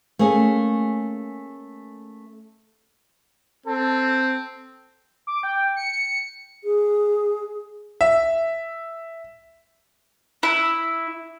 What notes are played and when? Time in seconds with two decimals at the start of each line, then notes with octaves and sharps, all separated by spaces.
0.19 A3 A#3 C#4 G#4
3.66 C4 A4
5.27 D6
5.43 G5
5.76 C#7
6.64 G#4
8.01 E5
10.43 E4